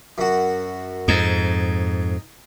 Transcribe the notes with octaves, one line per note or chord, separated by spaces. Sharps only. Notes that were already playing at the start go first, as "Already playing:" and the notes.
F#2 F#4
F2 G#2 D#4